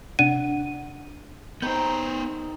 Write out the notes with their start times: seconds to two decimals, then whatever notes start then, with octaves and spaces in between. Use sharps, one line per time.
0.19 C3 D4 F#5 D#7
1.62 D#3 B3 G#4 C5 G6